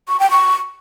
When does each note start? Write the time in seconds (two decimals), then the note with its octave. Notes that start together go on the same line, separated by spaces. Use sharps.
0.09 C#6
0.20 G5
0.31 C#6